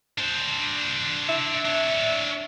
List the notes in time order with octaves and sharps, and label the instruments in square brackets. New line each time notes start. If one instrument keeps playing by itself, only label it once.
[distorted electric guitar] D4 C5
[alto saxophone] E5
[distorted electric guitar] D4 C#5